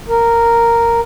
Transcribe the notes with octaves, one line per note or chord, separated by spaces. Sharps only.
A#4